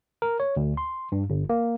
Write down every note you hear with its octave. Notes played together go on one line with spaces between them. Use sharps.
A#4
C#5
D2
C6
G2
G1
A#3